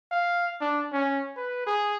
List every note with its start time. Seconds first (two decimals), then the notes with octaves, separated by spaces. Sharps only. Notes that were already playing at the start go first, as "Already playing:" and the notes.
0.11 F5
0.61 D4
0.93 C#4
1.37 B4
1.67 G#4